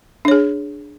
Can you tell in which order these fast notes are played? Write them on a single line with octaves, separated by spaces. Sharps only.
D4 C#5 G#4